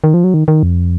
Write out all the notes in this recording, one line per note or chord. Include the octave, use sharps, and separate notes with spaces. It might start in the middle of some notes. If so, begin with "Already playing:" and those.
D#3
F3
F#3
D#3
D#3
F2